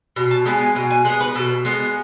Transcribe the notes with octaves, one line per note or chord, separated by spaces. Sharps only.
B2
A5
G#3 B3 G#5
G#5
B2 G#5
G#5
G#3 B3 F#5
B4
B2 A4
G#3 B3 A4